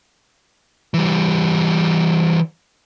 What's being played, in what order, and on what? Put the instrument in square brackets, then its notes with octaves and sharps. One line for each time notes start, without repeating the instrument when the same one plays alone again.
[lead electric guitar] E3 G3